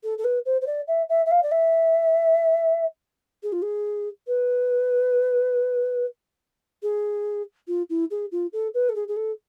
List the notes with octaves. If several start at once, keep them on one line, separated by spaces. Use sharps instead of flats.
A4
A4
B4
C5
C5
D5
E5
E5
E5
F5
D5
E5
G#4
F4
G#4
B4
G#4
F4
E4
G#4
F4
A4
B4
A4
G#4
G#4
A4